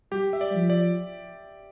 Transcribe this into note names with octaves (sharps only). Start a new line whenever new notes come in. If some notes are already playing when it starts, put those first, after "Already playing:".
G3 G4
E5
D5
F3
D5